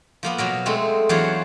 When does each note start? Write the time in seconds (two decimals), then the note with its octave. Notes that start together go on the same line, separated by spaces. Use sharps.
0.23 F3 A#3 B3
0.38 B2 F#3 A#4
0.66 G#3 A3 C4
1.09 E2 F#3 D4 F4 C5 C#5